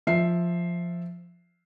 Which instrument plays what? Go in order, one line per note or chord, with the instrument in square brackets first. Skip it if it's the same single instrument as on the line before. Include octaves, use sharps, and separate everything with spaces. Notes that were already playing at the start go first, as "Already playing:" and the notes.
[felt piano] F3 E5 C7